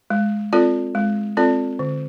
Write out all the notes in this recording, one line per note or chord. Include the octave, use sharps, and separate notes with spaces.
G#3
C4 F4 A4 D5
G#3
C4 F4 A4 D5
D3